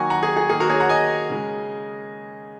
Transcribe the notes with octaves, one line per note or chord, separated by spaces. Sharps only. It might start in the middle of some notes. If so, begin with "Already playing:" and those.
Already playing: D#3 F#3 A#3 F#5 G#5 A#5 C#6
F#5 A#5
G#4
G#4
D#3 A#3 G#4
F#4 A#4
G#4 C#5
F#5 A#5
D#5 G#5
C#3 G#3